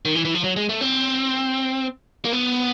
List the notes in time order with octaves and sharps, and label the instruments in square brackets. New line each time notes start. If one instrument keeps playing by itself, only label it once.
[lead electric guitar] D#3
E3
E3
F3
F#3
G#3
A3
C4
A#3
B3